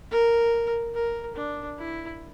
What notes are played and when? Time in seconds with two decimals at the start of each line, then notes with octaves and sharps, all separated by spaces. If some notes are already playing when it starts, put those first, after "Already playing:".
0.11 A#4
0.95 A#4
1.36 D4
1.78 E4